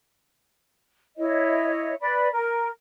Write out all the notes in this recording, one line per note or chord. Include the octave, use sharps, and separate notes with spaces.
E4 C#5 D#5
B4 D5 B5
A#4